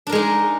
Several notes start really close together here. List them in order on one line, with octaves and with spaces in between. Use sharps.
D4 A#4 G#3 D#4